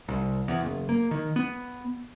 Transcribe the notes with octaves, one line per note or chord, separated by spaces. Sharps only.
C2
E2
F#1
A#3
D#3
B3